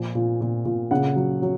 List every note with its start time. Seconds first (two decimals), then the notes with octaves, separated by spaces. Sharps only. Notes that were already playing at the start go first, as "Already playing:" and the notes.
Already playing: A#2 F3 G#5
0.15 A#2
0.41 A#2
0.65 A#2
0.91 C#3 F#5
1.16 F#3
1.42 F#3